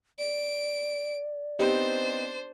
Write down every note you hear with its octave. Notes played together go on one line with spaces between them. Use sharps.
D5 D7
B3 C4 D4 D#4 G4 C5